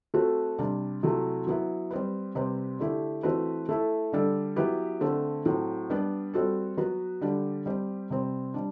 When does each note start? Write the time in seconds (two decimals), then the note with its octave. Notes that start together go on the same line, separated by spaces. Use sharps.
0.14 A3 C4 F#4 A4
0.58 C3 G3 D4
1.03 C3 F#3 A3 E4
1.47 F#3 B3 E4
1.91 G3 C4 G4 B4
2.35 C3 G3 C4 G4 B4
2.80 D3 A3 E4 G4
3.23 E3 A3 C4 F#4 B4
3.69 A3 E4 A4
4.12 D3 G3 D4 A4
4.56 F#3 B3 E4 G4 B4
5.01 D3 A3 C4
5.46 A2 F#3 C4
5.90 G3 B3 D4
6.34 G3 C4 F#4 A4
6.77 F#3 B3 F#4 B4
7.21 D3 G3 D4 G4
7.66 G3 C4 G4
8.10 C3 G3 C4
8.54 G3 D4